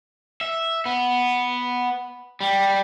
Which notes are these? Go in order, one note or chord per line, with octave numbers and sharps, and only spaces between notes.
E5
B3
G3